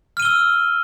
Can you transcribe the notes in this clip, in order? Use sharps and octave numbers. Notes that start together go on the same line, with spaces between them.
E6 F6 D#7 G7